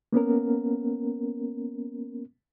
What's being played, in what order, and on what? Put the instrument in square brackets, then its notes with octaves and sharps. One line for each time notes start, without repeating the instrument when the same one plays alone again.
[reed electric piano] A#3 B3 C#4 A#4